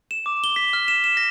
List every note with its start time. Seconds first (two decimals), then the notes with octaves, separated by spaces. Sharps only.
0.11 E7
0.26 D6
0.44 G7
0.56 B6
0.73 F6
0.88 E7
1.04 E7
1.17 A#6